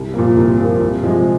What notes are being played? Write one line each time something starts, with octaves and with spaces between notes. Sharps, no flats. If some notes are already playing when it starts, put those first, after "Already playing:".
Already playing: C2
A#2 F3 A#3
C2
A#2 F3 A#3
C2
C3 F3 G#3